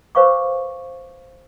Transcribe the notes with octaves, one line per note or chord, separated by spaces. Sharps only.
B4 C5 F5 C#6 D6